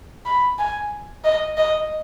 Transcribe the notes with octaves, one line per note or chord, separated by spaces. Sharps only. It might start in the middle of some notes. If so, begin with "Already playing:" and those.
B5
G#5
D#5
D#5